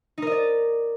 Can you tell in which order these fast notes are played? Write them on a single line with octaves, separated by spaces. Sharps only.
D#4 A#4 D#5 D5